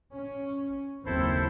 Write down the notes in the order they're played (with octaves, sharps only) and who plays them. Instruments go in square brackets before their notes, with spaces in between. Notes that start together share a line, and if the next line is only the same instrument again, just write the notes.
[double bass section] C#4
[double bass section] F#1 D#2 C4 [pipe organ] E4 A4 C5